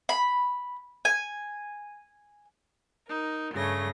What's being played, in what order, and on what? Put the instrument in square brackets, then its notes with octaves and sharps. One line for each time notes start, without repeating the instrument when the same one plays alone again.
[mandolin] B5
G#5
[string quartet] D#4 A#4
G2 C#3 A3 A#6